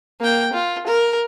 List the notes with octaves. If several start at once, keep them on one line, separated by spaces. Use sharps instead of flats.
A#3 G5
F4
A#4